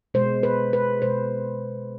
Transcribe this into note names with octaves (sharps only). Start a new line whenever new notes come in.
B2 G#3 C5
B4
B4
B2 G#3 C5